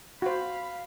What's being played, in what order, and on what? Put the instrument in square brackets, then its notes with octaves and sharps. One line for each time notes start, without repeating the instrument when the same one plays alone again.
[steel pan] F#4 C5 [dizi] F5 [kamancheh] B5